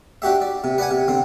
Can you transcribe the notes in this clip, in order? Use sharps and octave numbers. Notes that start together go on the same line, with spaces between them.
D4 F#4 G4 E5
D5
C3
B4 D5 F#5 G#5
C3
D3 C4